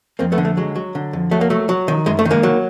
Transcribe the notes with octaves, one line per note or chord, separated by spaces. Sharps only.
F2 A#3 C4
A3 B3
D3
A3
F#3 G#3
F#3
D3
F2
F#3 A3
A#3
F#3 A3
F#3
D#3
F#2 G#3
A3
D#3
G#3 A#3
F#3